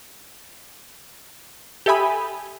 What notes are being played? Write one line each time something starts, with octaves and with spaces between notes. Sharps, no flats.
G4 A4 E5 G#5 B5 D#6